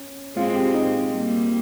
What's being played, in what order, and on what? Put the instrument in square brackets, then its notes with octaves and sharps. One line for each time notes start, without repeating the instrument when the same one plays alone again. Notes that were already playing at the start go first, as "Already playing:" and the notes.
Already playing: [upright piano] C#4
[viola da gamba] G#3 C4 [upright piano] F4
[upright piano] G4
D#4
[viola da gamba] G3 A#3